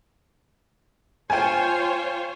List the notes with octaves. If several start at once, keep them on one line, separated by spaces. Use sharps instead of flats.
F4 C5 C#5 G5 G#5